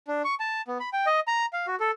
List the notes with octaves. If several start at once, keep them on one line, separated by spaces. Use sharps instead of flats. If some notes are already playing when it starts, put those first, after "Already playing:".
D4
C#6
A5
B3
B5
G5
D#5
A#5
F5
F#4
A4